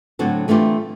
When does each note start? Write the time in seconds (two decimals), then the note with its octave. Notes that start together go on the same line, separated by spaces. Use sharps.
0.19 A2 D3 F#3 C4 F#4 A4
0.48 E3 A3 C4 D4 F4 G4